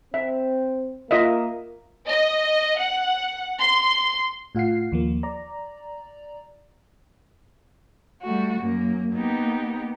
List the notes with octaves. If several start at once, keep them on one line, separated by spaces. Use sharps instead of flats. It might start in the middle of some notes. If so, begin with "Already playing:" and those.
C4 E5
A#3 F4 D#5 E5
D#5
F#5
C6
A2 F4 F5 F#5 C7
D#2 F3 A#3
D5 A#5
G3 A3 F#4
F#2 A#3
A#3 B3 D#4 G4